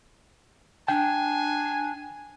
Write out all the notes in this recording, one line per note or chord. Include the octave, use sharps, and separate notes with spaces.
D4 G5 G#5